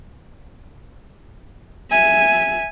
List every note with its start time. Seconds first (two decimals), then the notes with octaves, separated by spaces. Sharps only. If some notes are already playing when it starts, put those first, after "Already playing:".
1.91 E5 G#5